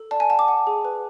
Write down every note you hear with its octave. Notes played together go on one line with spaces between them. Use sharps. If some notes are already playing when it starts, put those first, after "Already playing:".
Already playing: A4
D5 A5
G#5
F#5 A5
D6
F#5
G#4
B4